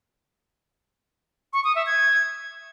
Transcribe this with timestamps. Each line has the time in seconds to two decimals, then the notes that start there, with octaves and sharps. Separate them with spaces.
1.53 C#6
1.64 D#6
1.75 E5
1.87 G#6